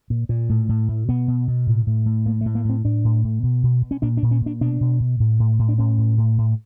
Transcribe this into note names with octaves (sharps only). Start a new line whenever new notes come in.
A#2
A#2
A2
A2
A2
B2 B3
B2
B2
A2
A2
A2
A2 A#3
A3
A2
A#3
A2 C4
A2 D4
A2
A2
B2
B2
B2
C#4
A#2 D4
D4
A#2
C#4
A#2 D4
B2 D4
B2
B2
A2
A2
A2
D4
A2 C#4
A2
A2
A2